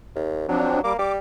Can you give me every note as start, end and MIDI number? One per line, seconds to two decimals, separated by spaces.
0.16 0.45 39
0.49 0.80 53
0.49 0.82 54
0.49 0.80 60
0.49 0.80 62
0.84 0.93 55
0.84 0.98 58
0.84 0.93 86
0.99 1.19 55
0.99 1.12 86